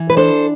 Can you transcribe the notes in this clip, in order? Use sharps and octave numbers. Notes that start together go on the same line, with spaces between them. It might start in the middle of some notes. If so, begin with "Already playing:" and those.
Already playing: E3
B4
D4 A4 C5